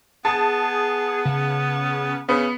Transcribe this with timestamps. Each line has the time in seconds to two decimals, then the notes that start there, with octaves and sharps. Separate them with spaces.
0.25 B3 G#4 A5
1.25 C#3
2.29 C#3 B3